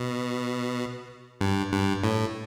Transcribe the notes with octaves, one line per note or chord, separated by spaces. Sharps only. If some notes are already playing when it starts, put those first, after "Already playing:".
Already playing: B2
G2
G2
A2